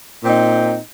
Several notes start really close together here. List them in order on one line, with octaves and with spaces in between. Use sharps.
A#2 C4 D#4